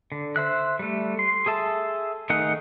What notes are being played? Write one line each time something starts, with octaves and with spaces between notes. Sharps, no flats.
D3
C5 E5 F#6
G3 A3
C6
G#4 A4 E5 A5
D#3 A3 D#4 G#4 F#5